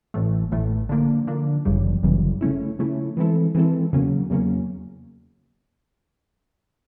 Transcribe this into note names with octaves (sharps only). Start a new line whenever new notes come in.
A1 A2 E3 A3
A1 A2 E3 A3
D3 F3 A#3 D4
D3 F3 A#3 D4
G1 F#2 C#3 E3 G3
G1 F#2 C#3 E3 G3
C#3 F3 A3 C#4 E4
C#3 F3 A3 C#4 E4
E3 G#3 C4 E4 A4
E3 G#3 C4 E4 A4
E2 C#3 F#3 A#3 C#4
E2 C#3 F#3 A#3 C#4